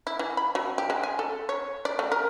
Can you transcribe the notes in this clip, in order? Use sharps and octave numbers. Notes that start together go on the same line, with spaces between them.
E4
E3
B5
F#3
G4
G#3
G#5
A4
C#5
D5
A3
A#4